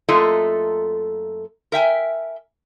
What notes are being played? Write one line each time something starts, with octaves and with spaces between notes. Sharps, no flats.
F#2 A3 A#3 F4 A4 D#5
A#4 E5 G5 G#5